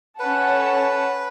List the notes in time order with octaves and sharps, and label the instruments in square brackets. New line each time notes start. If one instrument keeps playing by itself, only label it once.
[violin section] C#4 A4 C#5 F#5 A5 [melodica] B4